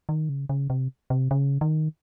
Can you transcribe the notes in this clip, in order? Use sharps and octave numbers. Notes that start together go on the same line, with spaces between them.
D#3
C#3
C#3
C3
C3
C#3
D#3